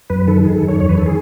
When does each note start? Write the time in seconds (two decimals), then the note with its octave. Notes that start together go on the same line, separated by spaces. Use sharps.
0.10 F#2 B4
0.27 D#3 A4
0.44 D#3 G#4
0.57 A4
0.62 F#2
0.68 C#5
0.80 E2 C#5
0.89 B4
0.98 D#3 A4
1.06 G#4